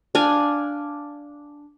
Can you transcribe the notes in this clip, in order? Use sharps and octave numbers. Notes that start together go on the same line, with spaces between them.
D4 F5 G#5